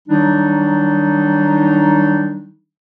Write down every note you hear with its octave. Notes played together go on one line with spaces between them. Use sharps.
D#3 F#3 G3 D4 D#4